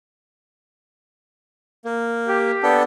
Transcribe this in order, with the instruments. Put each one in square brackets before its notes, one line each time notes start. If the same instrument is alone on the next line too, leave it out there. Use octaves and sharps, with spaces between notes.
[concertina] A#3
[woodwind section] G4
[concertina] B3 D4 A4